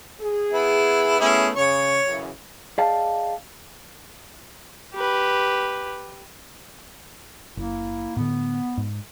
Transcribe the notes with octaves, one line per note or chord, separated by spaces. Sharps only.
G#4
B3 E4
A3 B3 C#4 E4 G#4
C#3 C#5 C#6
F#2 C#3 E3
G#4 D5 D#5 F5 G5 A5
G4 B4
F#1 A#3 E4
A2 D3 B3
G#2